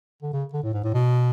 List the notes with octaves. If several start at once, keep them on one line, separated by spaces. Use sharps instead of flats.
D3
C#3
D3
A2
G#2
A2
B2